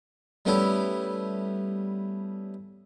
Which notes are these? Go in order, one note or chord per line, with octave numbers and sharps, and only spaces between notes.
G3 A3 B3 C#4 E4 A4